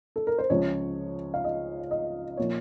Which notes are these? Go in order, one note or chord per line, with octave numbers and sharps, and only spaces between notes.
A4
A#4
C5
C#2 C#3 F3 C#5
F5
D#5
D#5
A#2 F3 C#5